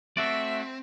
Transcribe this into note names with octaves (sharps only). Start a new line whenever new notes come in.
A3 C4 F#4 D5 E5